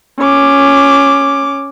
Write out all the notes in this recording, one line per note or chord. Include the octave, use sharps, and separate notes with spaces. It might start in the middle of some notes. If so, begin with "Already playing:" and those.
C#4 D6